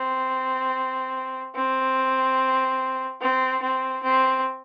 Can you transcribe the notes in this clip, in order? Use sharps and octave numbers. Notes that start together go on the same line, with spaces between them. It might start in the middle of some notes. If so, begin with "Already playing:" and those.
Already playing: C4
C4
C4
C4
C4